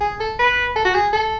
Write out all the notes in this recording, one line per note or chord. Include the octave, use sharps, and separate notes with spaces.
G#4
A4
B4
A4
F#4
G#4
A4